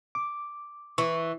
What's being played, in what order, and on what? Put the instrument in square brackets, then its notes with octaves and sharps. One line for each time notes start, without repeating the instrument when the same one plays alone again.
[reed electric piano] D6
[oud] E3 [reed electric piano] C#6